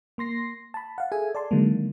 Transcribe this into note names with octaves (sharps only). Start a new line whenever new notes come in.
A#3 C6 A#6 C7
A5 B5
F5 F#5
G#4 A4 E5 G#5
D5 A5 C6
D3 D#3 F#3 G#3 A#3